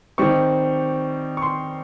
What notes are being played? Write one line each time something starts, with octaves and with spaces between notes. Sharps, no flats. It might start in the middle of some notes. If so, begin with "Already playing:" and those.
D#3 G3 C4 C#6
C#6
C6